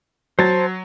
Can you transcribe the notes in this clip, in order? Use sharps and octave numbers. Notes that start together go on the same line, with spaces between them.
F#3 C5 A5